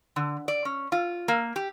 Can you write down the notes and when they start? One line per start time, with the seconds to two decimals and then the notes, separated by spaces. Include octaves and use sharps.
0.16 D3
0.48 D5
0.65 C#4
0.92 F4
1.28 A#3
1.56 G4